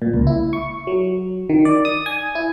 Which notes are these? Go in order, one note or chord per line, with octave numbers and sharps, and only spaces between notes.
A#2
C#2
E4
C#6
F#3
D#3
D5
D#6
G#5
E4